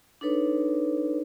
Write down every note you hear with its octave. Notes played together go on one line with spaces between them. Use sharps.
D4 D#4 A4 B4 C#5